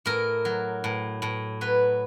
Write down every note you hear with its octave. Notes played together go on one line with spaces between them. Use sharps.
A2 A#4
F#3
A2
A2
F#3 B4